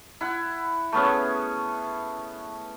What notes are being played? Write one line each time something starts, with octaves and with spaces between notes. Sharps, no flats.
E4 F#5
A3 B3 C#4 G#4